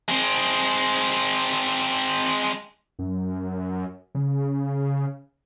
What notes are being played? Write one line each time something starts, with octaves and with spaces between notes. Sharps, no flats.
G#3 C4
F#2
C#3